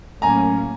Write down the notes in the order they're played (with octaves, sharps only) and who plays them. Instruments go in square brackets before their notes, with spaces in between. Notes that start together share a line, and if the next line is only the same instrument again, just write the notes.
[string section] A2 F#3 A#3 C#4 [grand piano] G#5 A#5